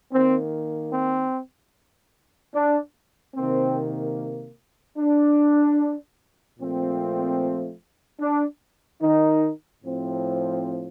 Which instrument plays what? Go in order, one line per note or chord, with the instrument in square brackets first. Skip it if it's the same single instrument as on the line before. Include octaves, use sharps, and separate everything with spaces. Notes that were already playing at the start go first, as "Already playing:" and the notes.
[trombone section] D#3 A#3 C4
C4
D4
C3 D#3 A#3 C4
D4
A#2 F3 A3 C4
D4
D#3 D#4
A2 F3 C4